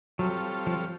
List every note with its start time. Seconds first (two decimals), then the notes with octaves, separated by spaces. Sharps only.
0.19 F#3 G3 C4 F4 A4 C#5
0.67 F3